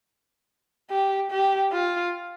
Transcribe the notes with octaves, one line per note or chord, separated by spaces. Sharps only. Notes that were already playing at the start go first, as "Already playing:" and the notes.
G4
G4
F4